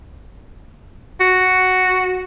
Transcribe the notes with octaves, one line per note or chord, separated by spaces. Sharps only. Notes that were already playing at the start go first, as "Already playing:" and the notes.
F#4